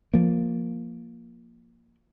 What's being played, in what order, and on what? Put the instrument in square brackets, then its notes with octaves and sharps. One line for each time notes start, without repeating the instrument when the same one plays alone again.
[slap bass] F3 A#3